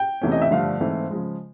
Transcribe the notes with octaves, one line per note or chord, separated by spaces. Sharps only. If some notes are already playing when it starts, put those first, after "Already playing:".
Already playing: G5
E2 C3 E3 A3 C#4
D#5
E5
G2 D3 F3 A3 F5
G#2 E3 A3 C4
C#3 F3 G#3